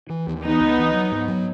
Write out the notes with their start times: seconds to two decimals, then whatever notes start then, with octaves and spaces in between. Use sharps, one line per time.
0.09 E3
0.27 D#2
0.44 E3 B3 D#4
0.60 C#2
0.78 E3
0.94 F#3
1.11 G#2
1.28 F#3